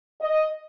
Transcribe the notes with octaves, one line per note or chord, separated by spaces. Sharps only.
D#5